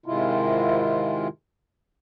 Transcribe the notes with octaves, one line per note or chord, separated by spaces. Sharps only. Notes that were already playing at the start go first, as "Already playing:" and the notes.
G#2 C3 D#3 G#3 E4 F4